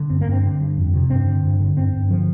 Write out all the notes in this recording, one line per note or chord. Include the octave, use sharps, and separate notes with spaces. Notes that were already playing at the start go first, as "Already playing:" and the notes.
Already playing: D3
G2 C4
A#3
G2
C4
D3
G2
F2
C3
G2 C4
D3
G2
D3
G2 C4
G2
D3 F3